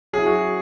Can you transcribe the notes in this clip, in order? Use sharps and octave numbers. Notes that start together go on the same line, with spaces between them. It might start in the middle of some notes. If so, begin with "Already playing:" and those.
F#3 C#4 E4 G#4
F#4